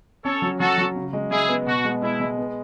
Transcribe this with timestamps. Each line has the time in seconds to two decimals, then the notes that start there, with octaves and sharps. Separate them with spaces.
0.25 C#4 A4 C#5
0.42 F#3
0.59 F#3 F#4 A4
0.78 F#3
0.96 C#3
1.13 G#3
1.31 G#3 E4 G#4
1.48 B3
1.66 B2 F#4
1.85 G#3
2.02 G#3 E4
2.20 G#3
2.38 B3